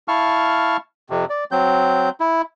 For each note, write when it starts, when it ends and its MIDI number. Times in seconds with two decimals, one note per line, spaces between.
0.08 0.77 64
0.08 0.77 77
0.08 0.77 81
0.08 0.77 85
0.08 0.77 89
1.10 1.25 41
1.10 1.25 48
1.30 1.44 74
1.51 2.10 54
1.51 2.10 60
1.51 2.10 91
2.20 2.42 64